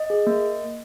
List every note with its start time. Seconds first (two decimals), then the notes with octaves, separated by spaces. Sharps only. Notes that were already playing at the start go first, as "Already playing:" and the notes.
Already playing: D#5
0.10 G#4
0.27 A#3